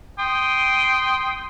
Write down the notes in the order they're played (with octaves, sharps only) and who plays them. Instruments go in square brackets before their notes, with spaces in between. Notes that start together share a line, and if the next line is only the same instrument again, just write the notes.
[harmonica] G5 C6 D#6